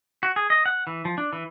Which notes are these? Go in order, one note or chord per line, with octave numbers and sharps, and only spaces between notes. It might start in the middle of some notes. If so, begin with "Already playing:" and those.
F#4
G#4
D#5
F#5
E3
F3
D4
E3